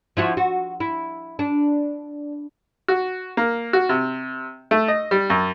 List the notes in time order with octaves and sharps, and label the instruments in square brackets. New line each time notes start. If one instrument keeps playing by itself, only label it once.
[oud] F3 E4 F#4
F#4
E4
D4
[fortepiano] F#4
A#3
F#4
C3
A3
D#5
G3
F#2